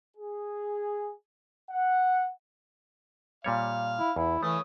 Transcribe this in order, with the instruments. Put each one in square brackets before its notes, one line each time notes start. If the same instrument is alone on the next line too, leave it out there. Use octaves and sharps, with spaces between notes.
[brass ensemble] G#4
F#5
[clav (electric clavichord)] A#2 G3 C#5 [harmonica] F5
[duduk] E4
[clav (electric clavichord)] E2 [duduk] E4
[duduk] E3 [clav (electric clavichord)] A3 [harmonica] C#5 D#6